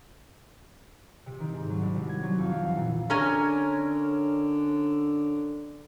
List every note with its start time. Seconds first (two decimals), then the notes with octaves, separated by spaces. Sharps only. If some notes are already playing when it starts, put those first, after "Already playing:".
1.26 C3
1.40 D#3
1.54 G#2
1.70 F#3
1.81 C2
1.96 C3
2.09 G#6
2.23 F#3
2.39 F2
2.52 F5
2.65 E3
2.77 A#2
3.10 D3 C#4 A#4 G#5